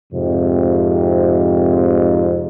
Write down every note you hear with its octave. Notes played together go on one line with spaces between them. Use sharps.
F2 G#2 C3